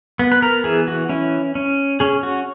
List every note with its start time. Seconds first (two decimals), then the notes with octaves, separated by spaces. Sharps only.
0.19 B3
0.32 B4
0.42 A#4
0.64 E3 G#4
0.88 F#4
1.09 C#4 E4
1.55 C#4
2.00 C#4 G#4
2.23 F#4